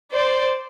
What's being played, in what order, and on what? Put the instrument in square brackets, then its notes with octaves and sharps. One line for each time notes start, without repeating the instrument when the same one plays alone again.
[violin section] C5 D5